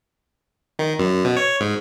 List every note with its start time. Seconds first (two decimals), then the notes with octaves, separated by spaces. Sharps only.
0.79 D#3
0.99 F#2
1.25 B2
1.37 C#5
1.60 G#2